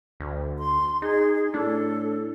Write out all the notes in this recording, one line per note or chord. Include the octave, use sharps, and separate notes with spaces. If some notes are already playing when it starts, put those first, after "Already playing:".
D2
C6
D#4 G#4
A2 D4 A4